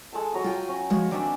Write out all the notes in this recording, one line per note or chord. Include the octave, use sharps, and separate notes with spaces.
G#3 A4 A5
F#3 A#5 D#6
F4 G5 G#5
C#4
F3 G#3 F#4
D#3 C4 D4 D5 G#5 B5